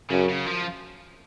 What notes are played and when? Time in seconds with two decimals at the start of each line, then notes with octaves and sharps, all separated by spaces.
0.10 F#2 C#3
0.29 C#3
0.46 F3